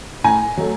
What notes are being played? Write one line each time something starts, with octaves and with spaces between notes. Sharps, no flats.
A2 G#5 A#5
F#3 A3